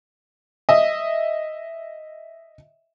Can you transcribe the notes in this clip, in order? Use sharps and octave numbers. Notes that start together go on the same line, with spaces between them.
D#5 E5